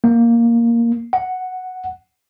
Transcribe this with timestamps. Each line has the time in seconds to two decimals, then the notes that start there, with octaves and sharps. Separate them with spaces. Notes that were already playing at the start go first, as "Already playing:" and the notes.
0.04 A#3
1.13 F#5